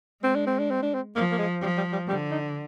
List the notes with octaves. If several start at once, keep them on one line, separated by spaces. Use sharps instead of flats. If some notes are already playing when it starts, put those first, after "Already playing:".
G#3 C4
D4
C4
D4
C4
D4
C4
F3 A#3
A#3
G#3
F3 G3
G3
G3
D3 G3
D#4